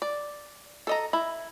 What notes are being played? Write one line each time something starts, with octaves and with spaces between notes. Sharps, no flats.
D5
A4 D#5 A#5
E4